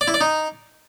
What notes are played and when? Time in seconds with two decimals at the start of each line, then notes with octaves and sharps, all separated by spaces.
0.01 D5
0.08 E4
0.14 D5
0.21 D#4